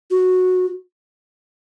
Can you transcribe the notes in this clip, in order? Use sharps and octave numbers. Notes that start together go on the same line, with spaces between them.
F#4